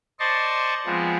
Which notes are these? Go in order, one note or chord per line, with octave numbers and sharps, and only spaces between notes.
C5 D5 D#5 A5 C6 C#6
F3 G#3 B3 C4